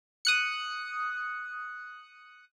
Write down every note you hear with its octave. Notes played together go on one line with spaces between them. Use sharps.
D#6 F#6 C#7